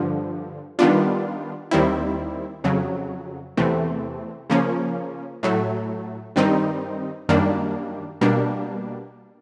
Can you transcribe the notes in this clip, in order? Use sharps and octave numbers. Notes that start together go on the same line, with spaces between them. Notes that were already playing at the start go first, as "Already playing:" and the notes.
Already playing: G2 D3 F3
D#3 G3 B3 D4 F4
D#2 D#3 G3 C4 E4
F2 C#3 F#3
E2 C3 E3 A3 C4
C#3 F3 A#3 C#4
A2 F#3 A3
G2 D#3 G3 C4 D#4
F#2 D#3 G3 A#3 D4
B2 G3 A#3 D4